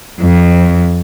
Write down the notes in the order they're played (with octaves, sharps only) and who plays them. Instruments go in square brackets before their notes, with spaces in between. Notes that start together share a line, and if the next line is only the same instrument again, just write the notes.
[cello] F2